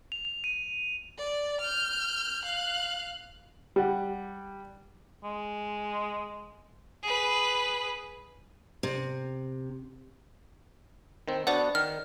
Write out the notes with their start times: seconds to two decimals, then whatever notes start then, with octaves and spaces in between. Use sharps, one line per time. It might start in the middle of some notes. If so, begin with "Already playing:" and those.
0.12 F7
0.25 F7
0.44 D#7
1.18 D5
1.61 F6 G6
2.42 F5 F#6
3.76 G3 F#5
5.24 G#3
7.03 G#4 B4
8.83 C3
11.28 D#3 C4
11.47 B3 D4 F#4 C5 D5 F#5
11.75 D#3 F6